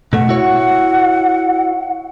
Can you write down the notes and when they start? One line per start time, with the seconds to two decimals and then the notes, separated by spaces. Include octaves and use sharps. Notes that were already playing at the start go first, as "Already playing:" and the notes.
0.13 B2 A3 F#5
0.29 E4 F#4 C#5